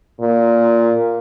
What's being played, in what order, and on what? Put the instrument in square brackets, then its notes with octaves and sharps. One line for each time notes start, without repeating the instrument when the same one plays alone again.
[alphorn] A#2